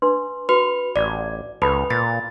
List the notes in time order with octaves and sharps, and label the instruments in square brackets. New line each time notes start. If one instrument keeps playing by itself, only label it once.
[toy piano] D4 B4 C6
[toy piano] F#4 [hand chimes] B4
[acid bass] A1 [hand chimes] D5
[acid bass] C#2 [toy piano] A4 A5 B5 [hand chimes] B4
[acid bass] A#2 [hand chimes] A6